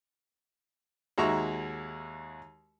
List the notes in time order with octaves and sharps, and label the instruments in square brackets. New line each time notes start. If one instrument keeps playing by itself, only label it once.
[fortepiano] D#2 G#3 F#4 E5 A#5 C#6